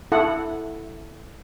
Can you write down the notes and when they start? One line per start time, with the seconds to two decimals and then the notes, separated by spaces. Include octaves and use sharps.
0.12 E4 A4 F#5